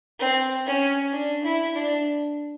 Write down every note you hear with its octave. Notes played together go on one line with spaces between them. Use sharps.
C4
C#4
D4
E4
D4